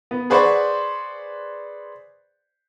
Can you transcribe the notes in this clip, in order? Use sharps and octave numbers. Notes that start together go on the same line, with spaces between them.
B3
G#4 B4 C5 D5 F#5 C#6